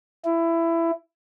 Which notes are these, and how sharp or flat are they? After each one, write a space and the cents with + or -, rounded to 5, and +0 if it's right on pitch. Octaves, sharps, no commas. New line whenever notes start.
E4 +15